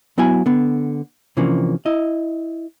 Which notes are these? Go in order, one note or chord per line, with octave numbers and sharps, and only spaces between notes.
F#3 B3 E4 F#4 G#5
D3 B3
C3 E3 F3 A#3 C#4 D4
E4 D#5